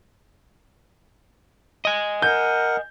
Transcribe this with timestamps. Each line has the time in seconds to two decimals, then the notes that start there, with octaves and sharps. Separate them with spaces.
1.85 D#5 G#5
2.22 A#4 F#5 G6